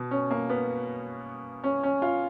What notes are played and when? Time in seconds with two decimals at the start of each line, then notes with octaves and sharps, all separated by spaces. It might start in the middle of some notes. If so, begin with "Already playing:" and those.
Already playing: B2
0.11 C#4
0.31 A#3
0.49 B3
1.64 C#4
1.83 C#4
2.02 F4